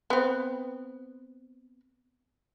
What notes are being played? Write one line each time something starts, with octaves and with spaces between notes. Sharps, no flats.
B3 C4